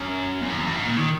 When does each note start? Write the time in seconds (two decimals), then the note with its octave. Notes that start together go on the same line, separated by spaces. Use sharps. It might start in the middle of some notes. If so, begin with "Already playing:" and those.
Already playing: F#2
0.41 E2
0.50 F#2
0.58 E2
0.67 F#2
0.75 G#2
0.85 A#2
0.97 D#3